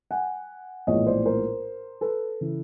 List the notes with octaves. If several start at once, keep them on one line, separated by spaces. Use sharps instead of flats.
F#5 G#5
A#1 A2 E3 G#3 B3 C#5 D#5
C5 D5
A#4 C5
A4 B4
C#3 E3